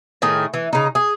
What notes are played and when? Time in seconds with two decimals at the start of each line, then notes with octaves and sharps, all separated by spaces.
0.22 A2 D#3 G#4
0.54 E3
0.73 C#3 D#4
0.95 G#4